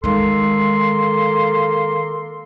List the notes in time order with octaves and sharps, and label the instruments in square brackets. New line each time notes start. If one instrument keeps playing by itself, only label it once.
[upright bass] D#3 G#3 [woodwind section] A#3 A4 C6